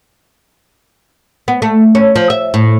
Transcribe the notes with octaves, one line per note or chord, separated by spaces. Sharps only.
B3
A3
C#4
F3
E5
A2